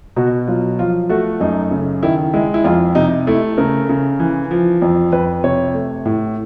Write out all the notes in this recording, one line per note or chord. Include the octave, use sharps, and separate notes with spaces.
B2 F#4
F#3 F4
F3 F4
A3 F#4
F#2 D#4
C#3
D#3 E4
G#3 E4
E4
F2 F4
C3 D#4
A3 E4
C#3 A#4
C#3
E3
F3
F2
F2 B4
C3 C#5
A3
A2